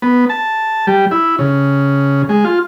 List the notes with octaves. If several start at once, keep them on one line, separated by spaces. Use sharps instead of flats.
B3
A5
G3
E4
C#3
G#3
F4